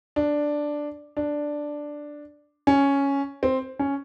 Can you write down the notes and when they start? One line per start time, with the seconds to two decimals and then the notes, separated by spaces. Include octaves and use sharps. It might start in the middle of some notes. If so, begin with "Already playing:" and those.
0.16 D4
1.17 D4
2.67 C#4
3.43 C4
3.79 C#4